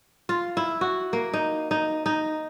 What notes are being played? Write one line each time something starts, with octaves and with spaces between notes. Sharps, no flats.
F4
E4
F#4
A#3
D#4
D#4
D#4